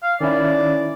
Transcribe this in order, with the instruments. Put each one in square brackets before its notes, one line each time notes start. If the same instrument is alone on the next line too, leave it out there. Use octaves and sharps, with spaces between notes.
[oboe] F5
[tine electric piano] D#3 C#4 E4 [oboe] D5